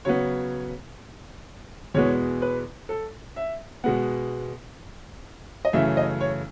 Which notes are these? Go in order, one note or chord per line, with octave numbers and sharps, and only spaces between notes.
C#3 F#3 B3 C#5
E2 B2 G#3 B3 C#5
B4
A4
E5
B2 G#3 B3 F#5
D#5
F#2 C#3 E3 A3 E5
D#5
C#5